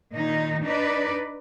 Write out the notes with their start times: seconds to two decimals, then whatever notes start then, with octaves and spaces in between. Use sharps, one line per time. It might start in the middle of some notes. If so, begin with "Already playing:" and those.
0.14 A#2 D#3 D#4
0.64 D4 D#4 B4 D5